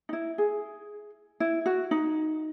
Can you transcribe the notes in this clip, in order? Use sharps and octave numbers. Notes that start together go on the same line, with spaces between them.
D#4
E4
G#4
E4
F#4
D#4